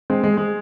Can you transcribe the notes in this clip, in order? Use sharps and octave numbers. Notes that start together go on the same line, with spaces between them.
G#3 C4
G#3
G#3